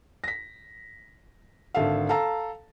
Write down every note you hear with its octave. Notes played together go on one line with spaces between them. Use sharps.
A#6 B6
G#1 D3 A4 E5 F5
A4 F5 A5 A#5 E6